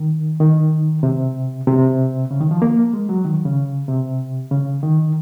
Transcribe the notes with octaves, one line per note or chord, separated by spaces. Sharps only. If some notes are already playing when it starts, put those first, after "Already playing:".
Already playing: D#3
D#3
C3
C3
C#3
D#3
F3
A#3
G#3
F#3
D#3
C#3
C3
C#3
D#3